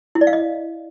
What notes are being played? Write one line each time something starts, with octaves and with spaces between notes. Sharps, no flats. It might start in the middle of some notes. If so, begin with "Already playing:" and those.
E4
D5
F5
D#5